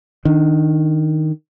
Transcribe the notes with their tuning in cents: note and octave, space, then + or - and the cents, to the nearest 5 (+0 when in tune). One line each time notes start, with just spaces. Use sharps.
D#3 +0 D4 +0